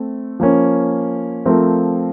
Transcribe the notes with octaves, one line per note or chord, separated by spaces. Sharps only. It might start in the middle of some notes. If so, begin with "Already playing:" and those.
Already playing: A3 C4
F3 A#3 C#4
F3 A3 C4 F4 A#4